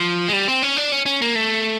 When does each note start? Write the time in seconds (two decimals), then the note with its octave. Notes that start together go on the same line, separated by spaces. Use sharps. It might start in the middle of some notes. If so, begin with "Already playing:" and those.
Already playing: F3
0.28 G#3
0.33 G3
0.48 C4
0.62 C#4
0.77 D4
0.92 C#4
1.06 C#4
1.22 A#3
1.35 A3